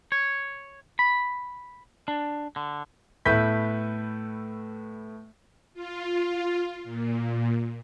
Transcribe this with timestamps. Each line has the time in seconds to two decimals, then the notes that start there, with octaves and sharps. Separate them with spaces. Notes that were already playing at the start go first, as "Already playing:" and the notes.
0.12 C#5
0.99 B5
2.08 D4
2.56 D3
3.25 A2 A3 B3 B4 G6 B6
5.74 F4
6.84 A#2